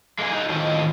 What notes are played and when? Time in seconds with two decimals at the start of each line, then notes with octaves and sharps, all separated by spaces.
0.19 G#3 A#3 D#4 G#4
0.32 D#4 F#4
0.49 A2 D#3 C4 F4 D#5